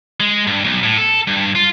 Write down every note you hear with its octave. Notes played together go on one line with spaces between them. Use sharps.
G#3
G2
B1
A2
A4
G2
F4